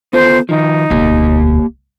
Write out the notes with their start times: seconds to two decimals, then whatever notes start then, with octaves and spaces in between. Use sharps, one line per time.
0.13 B3 F4 A4 C5
0.49 D#3 F3 D#4
0.90 E1 D2 A#3 G4